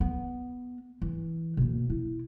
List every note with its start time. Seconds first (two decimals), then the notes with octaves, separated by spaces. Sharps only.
0.01 B3
1.02 E3
1.57 B2 A#3
1.90 E4